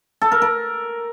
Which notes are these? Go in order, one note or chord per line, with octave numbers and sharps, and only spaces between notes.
A4
A#4
A#4